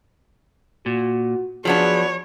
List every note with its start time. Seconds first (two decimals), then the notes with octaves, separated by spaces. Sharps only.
0.86 A#2 F#4
1.65 F3 F#3 B3 D4 G#4 C#5